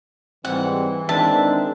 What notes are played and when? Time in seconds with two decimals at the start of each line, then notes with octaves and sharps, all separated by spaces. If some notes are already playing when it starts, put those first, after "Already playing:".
0.45 G#2 E3 G3 C4 F#5
1.09 D#3 E3 G#3 C4 D4 E5 A5